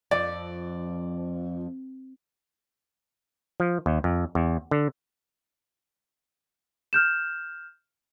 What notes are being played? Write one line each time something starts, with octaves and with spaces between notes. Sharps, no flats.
F2 F3 D5
F3
D#2
F2
E2
D3
F6 G6 E7